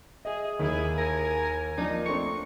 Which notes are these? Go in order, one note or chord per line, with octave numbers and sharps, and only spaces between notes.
G#4 D#5 E5
D#2 A#3 E4 G#4 G#5
A#4 G#5
F3 A#3 D4 D#4
A3 C4 D4 C#6